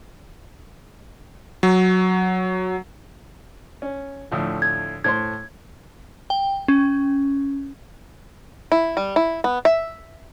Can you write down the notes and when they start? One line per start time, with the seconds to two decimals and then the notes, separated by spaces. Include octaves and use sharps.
1.63 F#3
3.82 C#4
4.31 D2 A2 F3
4.62 G#6
5.04 A2 C5 C6 G#6
6.30 G5
6.68 C#4
8.72 E4
8.97 G3
9.16 E4
9.44 B3
9.65 E5